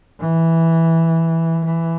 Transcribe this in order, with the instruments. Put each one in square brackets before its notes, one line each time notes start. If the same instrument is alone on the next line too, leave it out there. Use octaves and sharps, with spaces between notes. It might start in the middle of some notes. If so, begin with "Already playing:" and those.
[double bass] E3
E3